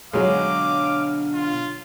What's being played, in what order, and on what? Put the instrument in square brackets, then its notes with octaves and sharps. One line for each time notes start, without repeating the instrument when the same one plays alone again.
[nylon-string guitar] B2 D3 [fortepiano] F#3 G#3 [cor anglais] F5 [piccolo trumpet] D6
[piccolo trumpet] F4